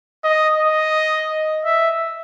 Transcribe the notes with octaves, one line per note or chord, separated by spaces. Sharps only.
D#5
D#5
E5